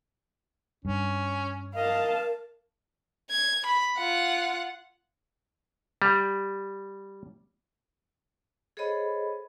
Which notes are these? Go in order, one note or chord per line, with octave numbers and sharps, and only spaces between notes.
G2 C#4
A#4 D#5 F5 A5
G#6
B5
F4 F#5
G3
G#4 A4 C5 C#5 D#5 B5